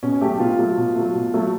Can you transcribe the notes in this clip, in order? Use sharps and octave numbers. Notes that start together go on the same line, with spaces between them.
B2 C#4
F#3 A3 G4
B2 F4
F#3 A3
B2
F#3 A3
B2
F#3 A3